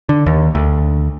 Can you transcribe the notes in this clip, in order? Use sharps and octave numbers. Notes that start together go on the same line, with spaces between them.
D3
D#2
D2